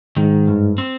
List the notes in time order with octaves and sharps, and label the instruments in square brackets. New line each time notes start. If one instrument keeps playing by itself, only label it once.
[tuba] G#2 [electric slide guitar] D#3
[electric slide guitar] G2
C4